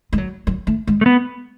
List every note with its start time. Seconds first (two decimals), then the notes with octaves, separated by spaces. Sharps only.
0.13 G#3
0.18 F#3
0.47 F#3
0.67 A3
0.87 G#3
1.01 A3
1.06 B3